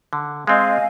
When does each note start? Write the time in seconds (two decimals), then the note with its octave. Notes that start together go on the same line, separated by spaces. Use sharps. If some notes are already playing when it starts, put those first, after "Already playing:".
0.13 D3
0.47 G#3 C4 D#5 F5 G#5